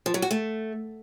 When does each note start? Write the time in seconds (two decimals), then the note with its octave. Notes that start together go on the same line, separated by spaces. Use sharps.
0.06 F3
0.14 F#3
0.22 F#4
0.31 A3